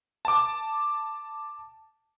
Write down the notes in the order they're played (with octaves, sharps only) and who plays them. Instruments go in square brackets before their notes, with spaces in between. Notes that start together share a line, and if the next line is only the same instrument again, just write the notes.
[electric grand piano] A5 D6